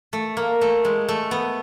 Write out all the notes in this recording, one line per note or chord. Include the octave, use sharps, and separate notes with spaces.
A3
A#3
A3
G#3
A3
B3